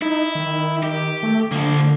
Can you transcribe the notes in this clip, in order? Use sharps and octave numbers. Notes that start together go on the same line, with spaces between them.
D#4 E4
D#3
G4
A3
D3 F3 A#3